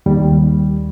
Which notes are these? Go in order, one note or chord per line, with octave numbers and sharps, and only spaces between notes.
D#2 G3